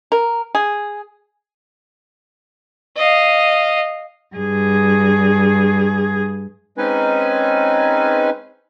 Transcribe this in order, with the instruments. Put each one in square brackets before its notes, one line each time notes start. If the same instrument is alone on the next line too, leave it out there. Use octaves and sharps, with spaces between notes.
[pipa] A#4
G#4
[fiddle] D#5 F5
[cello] G2 G#4
[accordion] G#3 C4 C#4 D#4 B4 G#5